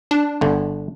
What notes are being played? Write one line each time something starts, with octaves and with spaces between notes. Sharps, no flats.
D4
G1 D3